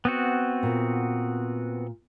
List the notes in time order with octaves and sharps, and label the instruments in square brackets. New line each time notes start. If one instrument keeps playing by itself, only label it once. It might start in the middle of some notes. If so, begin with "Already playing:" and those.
[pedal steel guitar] B3 C4 F#4
[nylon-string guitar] A#2